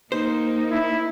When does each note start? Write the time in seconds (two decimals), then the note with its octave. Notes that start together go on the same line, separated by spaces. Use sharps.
0.12 A#3 D#4 C5
0.71 E4